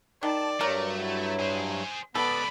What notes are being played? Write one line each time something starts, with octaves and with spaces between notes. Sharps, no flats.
D#3 D5 A5
G2 F#3 A3 A#4
E4
G#4 C5
C#2 B3 A4 D5 B5